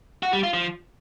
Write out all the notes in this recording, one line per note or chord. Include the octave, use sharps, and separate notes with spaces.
F#4
G3
F4
F3